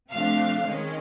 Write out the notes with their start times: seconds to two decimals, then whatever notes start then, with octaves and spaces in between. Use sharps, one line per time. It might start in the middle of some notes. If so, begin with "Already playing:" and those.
0.10 C3 F3 A3 D4 F5
0.65 D#3 G#3 C#4